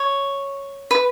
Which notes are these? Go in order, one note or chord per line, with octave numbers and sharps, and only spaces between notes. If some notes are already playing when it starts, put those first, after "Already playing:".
Already playing: C#5
B4